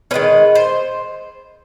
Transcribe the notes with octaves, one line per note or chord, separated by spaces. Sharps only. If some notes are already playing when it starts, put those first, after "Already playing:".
D#3 G#3 C#4 B4
C5